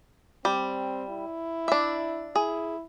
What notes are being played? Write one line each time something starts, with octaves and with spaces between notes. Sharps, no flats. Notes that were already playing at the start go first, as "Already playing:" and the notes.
G3 C4
E4
D4 E5
E4 G#4